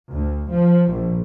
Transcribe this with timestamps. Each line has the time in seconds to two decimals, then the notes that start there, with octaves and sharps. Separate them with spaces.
0.11 D2
0.52 F3
0.90 A#1